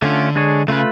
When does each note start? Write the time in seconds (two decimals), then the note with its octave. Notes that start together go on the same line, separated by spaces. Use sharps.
0.02 D3 A3 C#4 F4
0.35 G#3 D4 G#4 C#5
0.68 C#3 A3 F4 B4